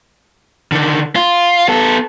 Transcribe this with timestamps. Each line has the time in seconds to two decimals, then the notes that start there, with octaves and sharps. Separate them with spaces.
0.72 D3 D#3
1.16 F4
1.68 B3 A4